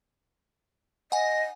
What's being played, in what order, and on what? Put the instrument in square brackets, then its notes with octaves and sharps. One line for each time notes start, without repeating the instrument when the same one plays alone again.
[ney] D#5 [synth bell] F#5 G#5